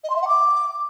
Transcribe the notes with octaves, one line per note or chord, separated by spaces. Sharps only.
D#5
C6
E5
F#5
D6